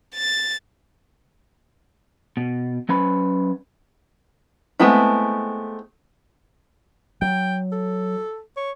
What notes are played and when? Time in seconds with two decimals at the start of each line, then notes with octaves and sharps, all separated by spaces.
0.15 A6
2.37 B2
2.89 F#3 C#4 B4 B5
4.79 G#3 A3 B3 C4 E4
7.22 F#3 G5
7.72 A4
8.57 C#5